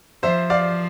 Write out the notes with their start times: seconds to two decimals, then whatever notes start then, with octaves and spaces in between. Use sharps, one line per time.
0.23 F3 C5 E5
0.50 D5 F5